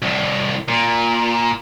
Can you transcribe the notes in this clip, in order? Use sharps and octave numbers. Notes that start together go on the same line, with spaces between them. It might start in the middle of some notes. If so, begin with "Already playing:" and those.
C2 A2
A#2